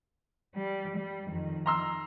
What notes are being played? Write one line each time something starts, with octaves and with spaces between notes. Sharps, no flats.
G3
G3
F2 D#3
A#5 C6 E6